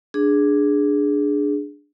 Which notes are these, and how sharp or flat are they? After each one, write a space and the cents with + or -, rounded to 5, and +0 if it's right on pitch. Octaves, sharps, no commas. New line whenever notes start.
D4 +0 G#4 +0